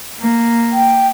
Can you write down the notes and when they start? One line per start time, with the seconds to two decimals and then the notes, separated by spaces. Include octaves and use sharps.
0.19 A#3
0.72 G5